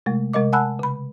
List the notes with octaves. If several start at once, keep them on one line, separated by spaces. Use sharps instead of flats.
C3 G#3 A3
C3 G#3 A#4 D#5 D6
F#5 G#5 A5 B5 E6 F#6
C#3 B5